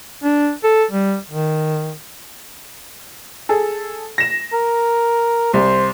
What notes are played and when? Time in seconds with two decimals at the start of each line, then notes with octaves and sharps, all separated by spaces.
0.24 D4
0.64 A4
0.91 G3
1.30 D#3
3.49 G#4 A4
4.18 A#6 E7
4.53 A#4
5.54 C2 C5